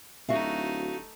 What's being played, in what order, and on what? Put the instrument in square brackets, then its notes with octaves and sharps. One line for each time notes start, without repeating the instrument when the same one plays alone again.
[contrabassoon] D1 [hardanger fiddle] A3 D#4 [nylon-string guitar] F#4 E5 F5